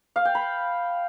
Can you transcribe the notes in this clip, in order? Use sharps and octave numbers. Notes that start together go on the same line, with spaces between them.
F5
G5
B5